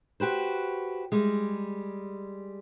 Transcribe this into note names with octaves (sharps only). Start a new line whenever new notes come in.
F#4 G4 B4 C5
G3 G#3